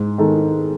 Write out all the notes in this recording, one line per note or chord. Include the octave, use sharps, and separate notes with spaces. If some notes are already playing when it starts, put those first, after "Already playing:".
Already playing: G#2
D#3 G#3 D#4 A4